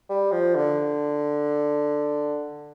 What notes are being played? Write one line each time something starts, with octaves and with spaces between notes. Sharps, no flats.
G3
F3
D3